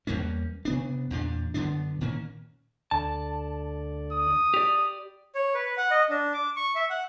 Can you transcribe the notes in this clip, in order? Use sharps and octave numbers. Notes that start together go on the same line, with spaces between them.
E2 G3 A#3 C#4
C3 B3 D4
E2 A#2 D4
F#2 D3 B3 D4
A#2 D#3 A#3 C#4
D2 D3 D5 A5
D#6
G4 D5
C#5
B4
F#5
D#5
D4
D6
C#6
E5
F#5